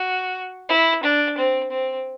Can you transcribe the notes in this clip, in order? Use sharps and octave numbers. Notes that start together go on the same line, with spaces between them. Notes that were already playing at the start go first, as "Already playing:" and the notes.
Already playing: F#4
E4
D4
C4
C4